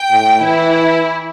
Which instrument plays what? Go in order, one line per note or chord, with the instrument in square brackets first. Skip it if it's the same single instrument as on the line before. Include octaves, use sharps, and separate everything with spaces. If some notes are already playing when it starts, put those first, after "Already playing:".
Already playing: [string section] G5
[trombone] A2
[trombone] E3 [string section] E4